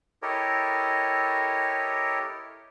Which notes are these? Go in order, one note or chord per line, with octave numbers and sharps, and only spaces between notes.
E4 G4 A4 A#4 C#5 D#5